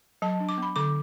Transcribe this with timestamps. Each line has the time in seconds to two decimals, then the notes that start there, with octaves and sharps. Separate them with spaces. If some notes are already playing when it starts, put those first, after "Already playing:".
0.22 F#3 A5
0.40 D4
0.49 D6
0.58 B3 B5
0.76 D3 D6